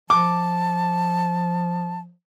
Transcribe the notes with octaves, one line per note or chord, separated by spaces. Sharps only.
F3 A5 D6